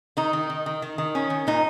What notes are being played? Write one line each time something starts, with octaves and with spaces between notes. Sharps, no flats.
D#3 D#4
D#3
D#3
D#3
D#3
D#3
C#4
D#3
A#2 D#4